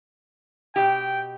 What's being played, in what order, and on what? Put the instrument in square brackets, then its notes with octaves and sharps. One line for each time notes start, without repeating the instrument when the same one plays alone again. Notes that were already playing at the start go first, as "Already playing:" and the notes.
[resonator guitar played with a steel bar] B2 G4 [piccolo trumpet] G5